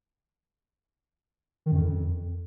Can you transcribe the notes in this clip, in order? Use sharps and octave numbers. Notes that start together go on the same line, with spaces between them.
D#3
F#2
F2